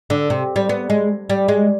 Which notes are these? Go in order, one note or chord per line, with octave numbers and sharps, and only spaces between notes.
D3
C3
G3
B3
G#3
G3
G#3